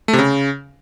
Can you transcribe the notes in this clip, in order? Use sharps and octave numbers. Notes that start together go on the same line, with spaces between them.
A3
C3
C#3